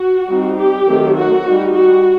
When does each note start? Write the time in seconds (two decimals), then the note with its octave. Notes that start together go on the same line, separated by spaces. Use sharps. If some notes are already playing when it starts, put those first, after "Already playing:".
Already playing: F#4
0.29 G3 C4 D#4
0.58 G4
0.87 D#3 F#3 A3 C4
1.16 F#4
1.45 G3 D#4
1.74 F#4